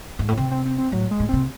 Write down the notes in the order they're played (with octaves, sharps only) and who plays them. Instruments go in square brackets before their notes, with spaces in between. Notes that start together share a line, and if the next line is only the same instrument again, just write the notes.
[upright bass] G#2
A2
[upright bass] C3 [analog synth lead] C4
[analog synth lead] C4
C4
C4
[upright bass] A2 [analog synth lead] F#3
[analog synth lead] G#3
[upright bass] A2
[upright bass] C3 [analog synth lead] C4